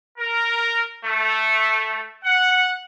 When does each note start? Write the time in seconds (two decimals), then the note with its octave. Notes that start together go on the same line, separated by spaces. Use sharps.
0.18 A#4
1.04 A3
2.23 F#5